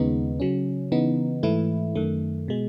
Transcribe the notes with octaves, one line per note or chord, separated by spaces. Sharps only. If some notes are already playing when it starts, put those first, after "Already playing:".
Already playing: D#2 C#3 G#3 B3 D#4
C#3 F#3 C#4
C#3 E3 B3 D#4
G#2 E3 A3 E4
F#2 D#3 A3
B2 G#3